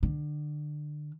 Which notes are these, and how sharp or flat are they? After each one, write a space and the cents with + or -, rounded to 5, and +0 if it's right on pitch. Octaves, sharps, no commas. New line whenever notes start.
D3 +25